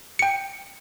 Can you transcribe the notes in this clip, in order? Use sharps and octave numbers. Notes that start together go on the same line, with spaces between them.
G5 C#7